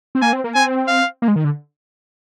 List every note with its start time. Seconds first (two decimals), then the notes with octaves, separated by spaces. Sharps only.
0.15 C4
0.22 A#3 G#5
0.33 C4
0.44 A#3
0.55 C4 G#5
0.88 F5
1.22 A#3
1.28 G#3
1.36 D#3
1.44 D3